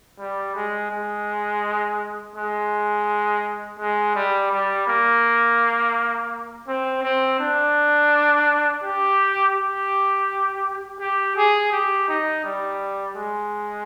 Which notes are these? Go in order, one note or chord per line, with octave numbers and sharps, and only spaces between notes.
G3
G#3
G#3
G#3
G#3
G3
G3
A#3
C4
C4
D4
G4
G4
G4
G#4
G4
D#4
G3
G#3